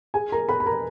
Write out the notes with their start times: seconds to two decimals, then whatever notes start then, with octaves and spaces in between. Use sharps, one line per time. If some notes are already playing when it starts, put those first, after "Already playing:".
0.14 G#4 G#5
0.32 A#4 A#5
0.49 B4 B5
0.60 B5
0.66 A#4 A#5